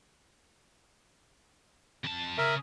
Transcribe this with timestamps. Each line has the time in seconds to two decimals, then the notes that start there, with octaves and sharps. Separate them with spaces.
2.04 F2 A5
2.38 C#3 G#4 A#4 E5